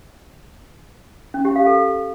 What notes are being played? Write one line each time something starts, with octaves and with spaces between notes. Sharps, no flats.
C#4
G4
F5
A4